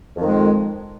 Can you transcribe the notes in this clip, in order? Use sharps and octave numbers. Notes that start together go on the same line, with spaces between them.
F2 D#3 G#3